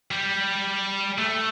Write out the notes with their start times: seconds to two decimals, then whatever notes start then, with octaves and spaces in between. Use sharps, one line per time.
0.11 G3
1.18 A3